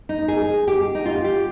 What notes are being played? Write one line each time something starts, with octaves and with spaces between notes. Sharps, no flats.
D#4
G#4
G4
D#4
F4
G4